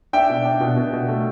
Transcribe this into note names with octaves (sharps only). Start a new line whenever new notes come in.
D4 E5 G5
B2
D4
B2
B2
B2
A3